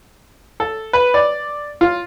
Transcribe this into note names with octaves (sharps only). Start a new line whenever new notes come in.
A4
B4
D5
F4